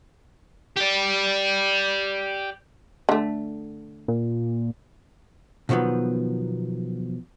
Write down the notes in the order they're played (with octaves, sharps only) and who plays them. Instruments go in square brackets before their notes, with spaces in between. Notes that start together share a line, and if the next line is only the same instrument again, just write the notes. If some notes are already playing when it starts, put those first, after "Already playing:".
[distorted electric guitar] G4 D5
[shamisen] D3 A3
[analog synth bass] A#2
[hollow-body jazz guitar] B2 D#3 F3 F#3 B3